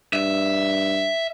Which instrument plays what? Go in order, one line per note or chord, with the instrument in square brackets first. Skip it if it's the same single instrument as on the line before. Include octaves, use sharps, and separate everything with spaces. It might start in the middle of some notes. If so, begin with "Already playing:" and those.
[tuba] G2 [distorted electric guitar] E5